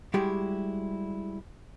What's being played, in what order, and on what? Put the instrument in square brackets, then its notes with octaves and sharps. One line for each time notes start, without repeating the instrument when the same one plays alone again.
[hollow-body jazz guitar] G3 G#3 E4 F#4 G4